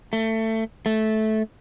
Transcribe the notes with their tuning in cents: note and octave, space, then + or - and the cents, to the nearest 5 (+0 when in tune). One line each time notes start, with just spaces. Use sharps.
A3 +20
A3 -15